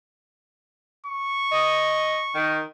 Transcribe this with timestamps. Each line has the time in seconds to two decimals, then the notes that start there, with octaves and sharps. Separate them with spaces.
1.07 C#6
1.52 D#5
2.35 D#3